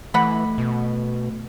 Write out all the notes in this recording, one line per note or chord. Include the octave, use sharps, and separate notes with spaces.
E3 A3 F#5 B5
B2